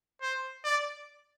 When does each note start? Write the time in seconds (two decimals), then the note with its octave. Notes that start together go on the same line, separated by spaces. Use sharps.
0.22 C5
0.64 D5